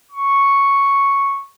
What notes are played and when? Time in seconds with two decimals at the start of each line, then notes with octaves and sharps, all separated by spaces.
0.11 C#6